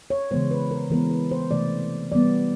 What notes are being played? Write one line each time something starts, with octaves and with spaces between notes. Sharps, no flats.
C#5
C#3 E3 G#3 B3 C5
B4
A#4
E3 G#3 B3 A#4
B4
C5
C3 E3 A3 D5
E3 G3 B3 D5